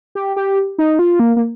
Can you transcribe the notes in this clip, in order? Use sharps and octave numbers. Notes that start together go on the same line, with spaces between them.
G4
G4
D#4
F4
A#3
A#3